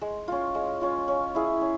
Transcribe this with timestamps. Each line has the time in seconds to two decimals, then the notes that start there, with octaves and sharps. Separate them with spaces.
0.01 G#3
0.28 C#4 F4
0.55 G#3
0.81 C#4 F4
1.08 C#4
1.35 E4 G#4
1.61 C#4